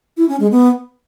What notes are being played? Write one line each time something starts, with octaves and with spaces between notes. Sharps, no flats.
E4
C#4
G#3
B3